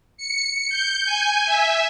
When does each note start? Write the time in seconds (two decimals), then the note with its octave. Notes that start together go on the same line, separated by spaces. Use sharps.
0.17 C#7
0.70 G6
1.05 G#5
1.46 E5